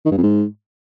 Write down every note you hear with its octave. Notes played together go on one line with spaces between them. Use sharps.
D#3
G2
F2
G#2